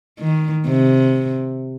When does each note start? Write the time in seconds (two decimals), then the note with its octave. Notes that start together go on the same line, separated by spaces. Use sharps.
0.20 D#3
0.66 C3